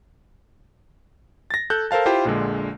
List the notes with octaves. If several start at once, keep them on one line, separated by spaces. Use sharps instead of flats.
A6 A#6
A4 F#6 G6
A4 A#4 C5 F5 A5
E4 F4 G4 C5 G5
A#1 A#2 D3 G#3